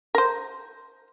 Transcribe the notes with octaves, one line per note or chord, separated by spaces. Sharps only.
A#4 C5